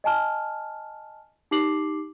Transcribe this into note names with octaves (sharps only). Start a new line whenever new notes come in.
D#5 G#5 A5 F6
D#4 G4 D6 C7 F#7